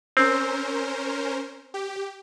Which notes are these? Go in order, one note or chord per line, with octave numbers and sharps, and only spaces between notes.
C4 C#4 A#4 C5
G4